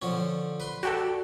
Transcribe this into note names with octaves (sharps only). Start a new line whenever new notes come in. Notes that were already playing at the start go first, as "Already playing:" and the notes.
D3 F3 C#4
B4 C6
F#4 G4 A4 D5